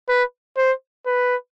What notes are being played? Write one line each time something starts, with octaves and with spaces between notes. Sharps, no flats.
B4
C5
B4